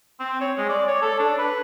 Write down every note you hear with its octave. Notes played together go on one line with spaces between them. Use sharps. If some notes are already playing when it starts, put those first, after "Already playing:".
C4
C#5
G#3
D5
C#5
A4
D4
B4